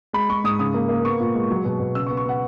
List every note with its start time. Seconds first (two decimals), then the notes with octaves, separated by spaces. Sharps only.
0.13 G#3 B5
0.29 G#3 C#6
0.44 G#2 D#6
0.59 C#3 D#6
0.74 A#3
0.89 A#3
1.04 B3 C#6
1.20 A#2
1.35 G#3
1.51 F#3
1.65 B2
1.80 B2
1.95 C#3 E6
2.07 C#6
2.10 B3
2.17 C#6
2.25 B3 F#5